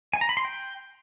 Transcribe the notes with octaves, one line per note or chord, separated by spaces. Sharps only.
G#5
A#5
B5
C6
G5